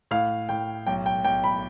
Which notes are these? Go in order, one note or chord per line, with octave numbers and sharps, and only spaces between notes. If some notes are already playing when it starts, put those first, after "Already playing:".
A2 F5
A2 G5
B1 G5
G5
B1 G5
B5